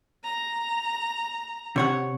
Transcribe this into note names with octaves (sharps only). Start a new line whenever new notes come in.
A#5
C3 C#5 F#5